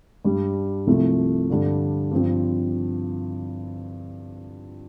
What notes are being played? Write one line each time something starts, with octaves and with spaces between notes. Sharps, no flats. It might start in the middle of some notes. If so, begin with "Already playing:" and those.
G2 G3 D4
C2 C3 F3 A3
G2 D3 G3 D4
G2 F3 C4